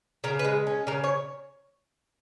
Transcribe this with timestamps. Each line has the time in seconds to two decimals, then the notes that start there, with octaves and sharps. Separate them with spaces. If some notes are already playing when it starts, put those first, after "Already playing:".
0.24 C#3 A#4
0.39 B4
0.45 G#3
0.67 C#4
0.87 C#3 A#4
1.04 C#5